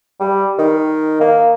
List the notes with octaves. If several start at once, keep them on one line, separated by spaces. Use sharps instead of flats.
G3
D#3
A#3